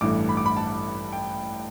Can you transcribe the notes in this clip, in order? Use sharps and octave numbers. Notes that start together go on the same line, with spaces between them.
A1 G2 E3 A3 D6
B5
D6
B5
A5
G5